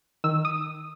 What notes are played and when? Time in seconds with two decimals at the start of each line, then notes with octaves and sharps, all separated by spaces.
0.24 D#3 E6
0.45 D#6